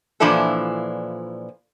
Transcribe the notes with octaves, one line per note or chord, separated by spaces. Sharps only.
A#2 E3 F3 D4 E4 A4